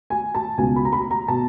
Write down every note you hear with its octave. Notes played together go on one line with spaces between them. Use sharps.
G#5
A5
C#2 B2 G#5
B5
A#5
B5
A#5
B2 A5